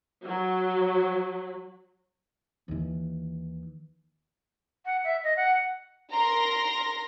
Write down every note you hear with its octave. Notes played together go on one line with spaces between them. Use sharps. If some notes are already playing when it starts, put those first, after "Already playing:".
F#3
D#2 E3
F#5
E5
D#5
F#5
A#4 A#5 C6 A#6